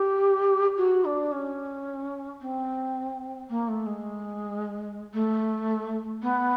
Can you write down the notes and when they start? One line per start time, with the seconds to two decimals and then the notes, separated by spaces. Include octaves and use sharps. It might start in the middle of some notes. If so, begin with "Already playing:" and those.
Already playing: G4
0.77 F#4
1.05 D4
1.32 C#4
2.41 C4
3.49 A#3
3.68 A3
3.86 G#3
5.13 A3
6.22 B3